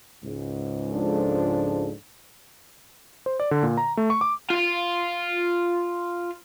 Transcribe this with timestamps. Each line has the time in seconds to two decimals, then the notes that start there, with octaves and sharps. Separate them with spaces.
0.23 C#2 G#2
0.93 F3 D4 A4
3.26 C5
3.40 D5
3.51 D3
3.63 A#2
3.77 A#5
3.97 A3
4.10 C#6
4.21 D6
4.50 F4 F5